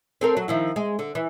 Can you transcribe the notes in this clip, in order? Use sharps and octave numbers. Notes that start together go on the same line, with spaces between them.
C4 A4 A#4
F#3
D#3 F3 E4
G#3
D3
E3